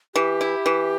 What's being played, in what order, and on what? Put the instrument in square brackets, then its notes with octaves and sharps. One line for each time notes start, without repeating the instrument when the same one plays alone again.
[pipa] E3 [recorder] G4
[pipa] E4
E3